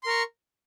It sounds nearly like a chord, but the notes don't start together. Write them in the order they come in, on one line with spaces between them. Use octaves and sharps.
C6 A#4 C#6